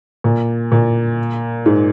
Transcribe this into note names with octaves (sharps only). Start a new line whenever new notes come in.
A#2
A#2
G#2